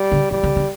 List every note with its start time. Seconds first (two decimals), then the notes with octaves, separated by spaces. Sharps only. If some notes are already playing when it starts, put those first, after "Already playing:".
Already playing: G3
0.12 D3
0.31 E3 G3
0.43 D3
0.56 D3